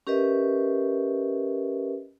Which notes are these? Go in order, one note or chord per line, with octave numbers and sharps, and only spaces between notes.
C#4 G4 A#4 B4 D#5 E5